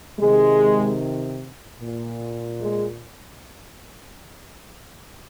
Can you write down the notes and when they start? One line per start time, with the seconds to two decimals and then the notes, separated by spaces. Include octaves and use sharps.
0.19 C3 D#3 G#3
1.80 A#2
2.60 G#3